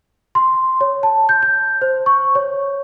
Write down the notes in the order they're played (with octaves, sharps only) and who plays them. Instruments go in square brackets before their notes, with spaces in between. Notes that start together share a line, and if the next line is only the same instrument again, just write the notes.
[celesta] C6
C#5
A5
G6
G6
C5
C#6
C#5